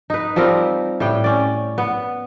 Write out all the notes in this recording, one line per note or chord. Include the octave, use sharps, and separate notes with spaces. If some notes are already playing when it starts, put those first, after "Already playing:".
D#4 B4
F3 G3 C4 A#4
A2 G3 G5
C#4 D5
B3